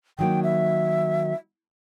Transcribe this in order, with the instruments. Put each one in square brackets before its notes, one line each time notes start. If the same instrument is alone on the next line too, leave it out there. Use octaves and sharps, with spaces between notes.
[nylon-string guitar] D#3 F#3 A#3 [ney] G5
[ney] E5